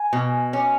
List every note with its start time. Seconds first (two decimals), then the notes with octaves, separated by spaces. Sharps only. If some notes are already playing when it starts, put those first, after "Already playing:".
Already playing: G#5
0.13 B2
0.53 C#4